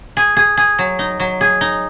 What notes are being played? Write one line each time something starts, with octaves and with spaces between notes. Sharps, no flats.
G#4
G#4
G#4
F#3
D#4
F#3
G#4
D#4